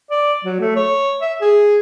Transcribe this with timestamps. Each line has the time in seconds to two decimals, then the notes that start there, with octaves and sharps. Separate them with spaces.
0.10 D5
0.45 F#3
0.60 A3
0.76 C#5
1.22 E5
1.41 G#4